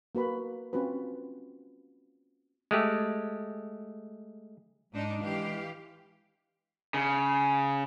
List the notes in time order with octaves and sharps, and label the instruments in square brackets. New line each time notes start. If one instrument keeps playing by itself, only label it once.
[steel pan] A#3 F#4 B4 B5
C4 C#4 F4 F#4 B4
[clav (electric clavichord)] G#3 A3 G4
[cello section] G#2 D4 D#4 [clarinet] G#3
[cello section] E3 G4 F5
[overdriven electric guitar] C#3